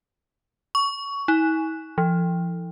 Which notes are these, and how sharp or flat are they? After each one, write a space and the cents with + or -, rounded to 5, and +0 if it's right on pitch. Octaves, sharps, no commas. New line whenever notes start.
C#6 +15
E4 -45
F3 -30